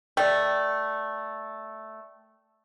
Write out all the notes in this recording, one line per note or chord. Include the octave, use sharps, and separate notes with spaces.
A3 D5 G5